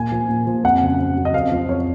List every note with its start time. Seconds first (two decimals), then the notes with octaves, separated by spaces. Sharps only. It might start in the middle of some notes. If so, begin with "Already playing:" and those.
Already playing: A#2 G#5
0.12 F3
0.29 A#2
0.47 F3
0.64 F2 F#5
0.81 C#3 F#3
0.99 F2
1.17 C#3 F#3
1.25 D#5
1.34 F2 F5
1.51 F3
1.69 F2 C#5